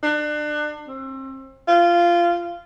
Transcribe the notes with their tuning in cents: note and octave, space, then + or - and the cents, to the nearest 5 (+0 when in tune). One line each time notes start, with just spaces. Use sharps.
D4 +30
C4 +35
F4 -15